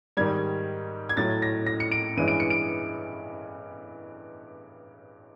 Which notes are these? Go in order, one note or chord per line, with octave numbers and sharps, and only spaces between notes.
G#2 D#3 G3 G#6
G#6
A2 F#3 A3 A6
A#6
A#6
C#7
D7
G2 E3 G#3 C#4 E4 D#7
D7
C#7
D7